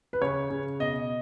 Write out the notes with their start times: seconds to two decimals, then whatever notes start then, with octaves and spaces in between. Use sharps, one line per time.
0.13 B4
0.21 C#3 C#5
0.50 C#3
0.79 B2 D#5